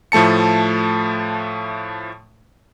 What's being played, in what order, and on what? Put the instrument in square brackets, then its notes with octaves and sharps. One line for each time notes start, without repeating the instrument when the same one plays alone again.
[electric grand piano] A2 F3 A3 A5 C#7